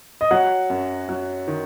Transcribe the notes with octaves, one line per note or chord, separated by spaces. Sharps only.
D#5
F#3 F#5
F#2
F#3
D#3